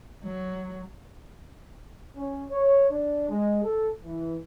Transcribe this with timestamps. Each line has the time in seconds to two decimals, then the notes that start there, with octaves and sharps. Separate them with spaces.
0.23 F#3
2.15 C#4
2.51 C#5
2.90 D4
3.29 G#3
3.62 A4
4.03 E3